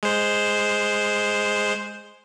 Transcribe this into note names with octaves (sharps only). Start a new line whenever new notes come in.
G#3 C5